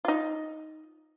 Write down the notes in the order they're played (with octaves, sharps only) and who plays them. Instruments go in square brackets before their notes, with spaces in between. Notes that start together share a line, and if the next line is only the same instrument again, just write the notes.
[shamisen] D#4 F4